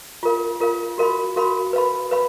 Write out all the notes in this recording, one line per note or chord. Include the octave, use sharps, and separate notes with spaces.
F4 A#4 F5
F4 A#4 F5
F#4 A#4 F5 B5
F#4 A#4 F5 B5
B4 F5 B5
B4 F5 B5